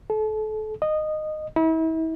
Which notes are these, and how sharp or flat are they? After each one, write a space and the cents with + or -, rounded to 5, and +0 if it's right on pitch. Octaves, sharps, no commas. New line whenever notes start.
A4 -35
D#5 -15
E4 -40